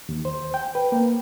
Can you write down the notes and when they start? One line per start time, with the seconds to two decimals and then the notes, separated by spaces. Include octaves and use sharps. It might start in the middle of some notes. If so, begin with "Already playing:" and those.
0.09 D#2
0.25 C5
0.54 G5
0.75 B4
0.92 A#3